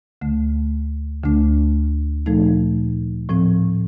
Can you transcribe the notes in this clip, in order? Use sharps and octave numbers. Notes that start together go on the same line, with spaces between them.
D2 D3 A3
D2 D3 A3 D4
A#2 F3 A3 D#4 A4
A2 F3 C4